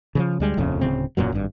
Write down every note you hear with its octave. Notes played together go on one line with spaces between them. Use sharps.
C#3 E3 F3
D2 G3 G#3
D#1 A#1 F2 C#3
D1 C#3 C4
E1 F#2 A#2 F#3
G#1 G2